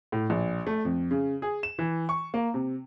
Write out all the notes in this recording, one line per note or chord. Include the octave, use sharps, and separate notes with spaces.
A2
A#1
A3
F2
C#3
G#4
E7
E3
C#6
A#3
C3